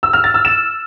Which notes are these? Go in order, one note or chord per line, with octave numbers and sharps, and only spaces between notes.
E6
F6
A6
E6
E7